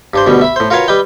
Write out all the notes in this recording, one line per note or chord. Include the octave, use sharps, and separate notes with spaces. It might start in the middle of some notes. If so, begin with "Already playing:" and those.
G2 D4 C5
D2 B2 G3
E5 B5
A2 C5
F4 F#4 A#4 B4 C#5 F5
G3 B4 D#5 G5